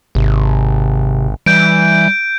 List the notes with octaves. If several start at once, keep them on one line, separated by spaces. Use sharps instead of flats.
G#1 C3
E3 G3 G6 D7